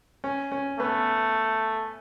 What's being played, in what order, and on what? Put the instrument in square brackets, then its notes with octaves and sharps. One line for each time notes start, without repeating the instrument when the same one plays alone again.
[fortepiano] C#4
C#4
[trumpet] A3 [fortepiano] B3